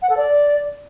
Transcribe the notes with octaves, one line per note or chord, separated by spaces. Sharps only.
F#5
A4
D5